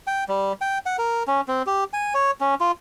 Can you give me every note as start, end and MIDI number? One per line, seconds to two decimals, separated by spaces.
0.07 0.24 79
0.28 0.53 55
0.61 0.78 79
0.86 0.96 78
0.99 1.23 70
1.28 1.41 61
1.48 1.62 60
1.66 1.84 67
1.93 2.14 80
2.14 2.31 73
2.41 2.55 61
2.60 2.72 65